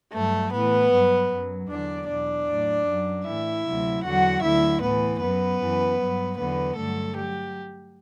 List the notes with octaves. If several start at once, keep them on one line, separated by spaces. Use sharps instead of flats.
G2 F#3 A3 A4
A2 E3 B3 B4
G2 F#3
F#2 F#3
E2 D3 F#3 D4 D5
E2 B2 F#3 D4 D5
A2 F#3
F#2 F#3
A2 E3 E4 E5
D2 C3 F#3
E2 D3 F#3 F#4 F#5
D2 D3 F#3 E4 E5
A2 E3 B3 B4
F#2 F#3 B3 B4
F#2 E3
G2 F#3
E2 D3 F#3 B3 B4
G2 D3 F#3 A3 A4
F#3 G4